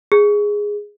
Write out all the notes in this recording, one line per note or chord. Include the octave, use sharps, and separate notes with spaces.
G#4